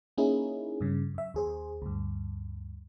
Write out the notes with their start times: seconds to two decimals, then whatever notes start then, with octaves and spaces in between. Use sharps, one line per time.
0.18 A#3 C#4 D#4 E4 G#4
0.81 G2 C#3
1.14 F#2 E5
1.34 D#2 G#4 C5
1.82 D2 G2